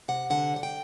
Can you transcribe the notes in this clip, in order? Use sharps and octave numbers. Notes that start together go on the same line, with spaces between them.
C3 F#5
D3 F#5
G3 F#5
G5